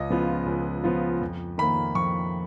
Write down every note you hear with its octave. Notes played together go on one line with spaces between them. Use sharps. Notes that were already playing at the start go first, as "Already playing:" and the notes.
Already playing: C#2 D#5
C#3 F3 B3 F4
C#2
C#3 F3 B3 F4
F2
D#3 A#3 B5
F2 C#6